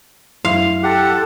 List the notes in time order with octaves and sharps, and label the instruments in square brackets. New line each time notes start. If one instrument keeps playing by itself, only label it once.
[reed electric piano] F#2 E4 C6 [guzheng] F5
[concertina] G4 F#5 [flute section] A4